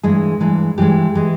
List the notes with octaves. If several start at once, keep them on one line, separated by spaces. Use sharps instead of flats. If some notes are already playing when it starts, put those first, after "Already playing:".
G2 E3 G#3 G#4
G2 E3 G#3
G2 E3 G#3 G4
E3 G#3